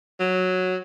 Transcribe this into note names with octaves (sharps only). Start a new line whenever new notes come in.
F#3